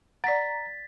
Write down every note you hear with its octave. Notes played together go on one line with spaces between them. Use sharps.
D5 F#5 A#5 A6 B6